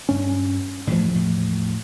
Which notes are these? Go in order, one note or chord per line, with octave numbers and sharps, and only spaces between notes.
G2 C#4
E1 A2 E3 F3 A3
A2